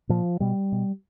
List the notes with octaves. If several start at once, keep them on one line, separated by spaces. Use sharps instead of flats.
A#2 F3
B2 G3
B2